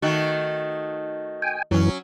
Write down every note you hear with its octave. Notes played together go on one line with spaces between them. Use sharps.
D#3 A3 F#4
G5 G#5
F#2 E3 F#3 C#4